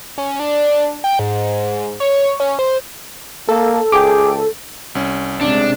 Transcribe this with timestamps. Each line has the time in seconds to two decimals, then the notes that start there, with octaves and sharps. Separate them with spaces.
0.18 C#4
0.40 D4
1.04 G5
1.19 G#2
2.00 C#5
2.40 C#4
2.59 C5
3.49 A#3 A4
3.92 C#2 G#4 G5 D6
4.95 C2 C#4
5.41 C3 G#3 D4